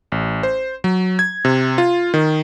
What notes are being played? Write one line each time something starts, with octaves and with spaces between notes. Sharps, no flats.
A1
C5
F#3
G#6
C3
F4
D#3